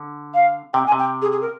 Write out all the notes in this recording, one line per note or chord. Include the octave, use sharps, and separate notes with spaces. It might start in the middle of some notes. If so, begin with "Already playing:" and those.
Already playing: D3
F5
C3 G5
G#5
C3
G5
G#4
G#4
A#4